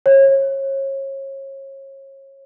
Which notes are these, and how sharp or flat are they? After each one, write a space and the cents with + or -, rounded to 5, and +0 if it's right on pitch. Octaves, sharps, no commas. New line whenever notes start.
C#5 -30